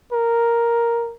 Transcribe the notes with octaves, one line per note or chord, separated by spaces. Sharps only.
A#4